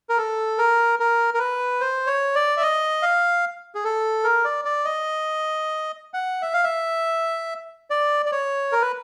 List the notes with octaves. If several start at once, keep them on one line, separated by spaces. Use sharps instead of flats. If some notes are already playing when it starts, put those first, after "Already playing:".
A#4
A4
A#4
A#4
A#4
B4
C5
C#5
D5
E5
D#5
F5
G#4
A4
A#4
D5
D5
D#5
F#5
E5
F5
E5
D5
D5
C#5
A#4
B4